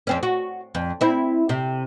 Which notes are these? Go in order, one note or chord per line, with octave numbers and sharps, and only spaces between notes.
F2 C4 C#4
F#4
F2
C4 E4
C3